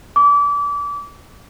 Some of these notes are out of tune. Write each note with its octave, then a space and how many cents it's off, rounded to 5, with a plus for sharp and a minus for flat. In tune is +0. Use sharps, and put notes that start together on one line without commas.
D6 -30